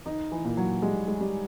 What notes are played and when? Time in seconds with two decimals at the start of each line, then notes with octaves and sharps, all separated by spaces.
0.06 D#3 D#4
0.32 E3
0.45 A#2
0.57 F#3
0.82 G3 G#3
1.08 G#3
1.21 G3